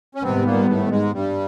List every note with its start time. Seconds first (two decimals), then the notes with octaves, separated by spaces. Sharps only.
0.15 C#4
0.23 G#2 C3 D#3 G3 B3 C4
0.46 A#2 A#3
0.69 A2 A3
0.91 G#2 G#3
1.14 G2 G3